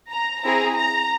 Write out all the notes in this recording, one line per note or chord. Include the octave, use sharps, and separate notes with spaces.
A#5
C4 E4 G#4 A#5
A#5